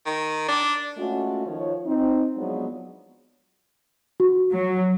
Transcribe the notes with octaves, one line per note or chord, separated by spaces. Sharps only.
D#3
D4
G#3 A3 C#4 F4 F#4
D#3 F3 C#5
C4 D#4
F3 F#3 G#3 B3 D4
F#4
F#3